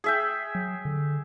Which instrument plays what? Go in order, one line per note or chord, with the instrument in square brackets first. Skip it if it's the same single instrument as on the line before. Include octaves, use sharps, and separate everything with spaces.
[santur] G#4 E5 G5
[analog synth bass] F#3
D3